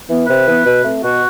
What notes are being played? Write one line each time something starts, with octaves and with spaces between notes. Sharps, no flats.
E3 B3
C3 B4
E3 B3
B2
A3 C4
B2 F#4